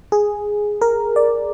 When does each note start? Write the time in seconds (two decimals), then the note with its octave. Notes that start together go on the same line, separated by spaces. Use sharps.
0.12 G#4
0.81 A#4
1.16 D5